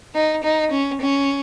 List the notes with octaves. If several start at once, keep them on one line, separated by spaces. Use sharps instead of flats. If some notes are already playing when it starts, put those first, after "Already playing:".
D#4
D#4
C#4
C#4